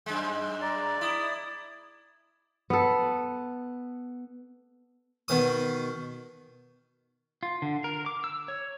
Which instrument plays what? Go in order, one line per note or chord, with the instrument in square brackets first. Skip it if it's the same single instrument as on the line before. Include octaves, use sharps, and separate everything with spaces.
[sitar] F#2 G#3
[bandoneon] D5 [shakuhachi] A#5
[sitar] E4 [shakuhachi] D#6
[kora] B3 A4
[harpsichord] B2 D#3 D#6
[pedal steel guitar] F4
D3
A#4
D6
E6
C#5